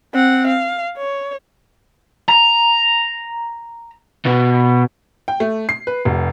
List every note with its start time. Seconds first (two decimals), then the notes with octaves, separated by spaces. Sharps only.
0.14 C4 F#5
0.47 F5
0.97 C#5
2.28 A#5
4.26 B2
5.28 G5
5.40 A3
5.69 C7
5.87 B4
6.05 F1